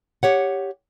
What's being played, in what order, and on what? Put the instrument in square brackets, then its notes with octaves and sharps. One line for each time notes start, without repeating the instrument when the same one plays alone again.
[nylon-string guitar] G4 C#5 F#5